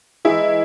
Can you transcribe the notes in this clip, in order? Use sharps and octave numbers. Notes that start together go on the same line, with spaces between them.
E3 G#3 D#4 E4 G#4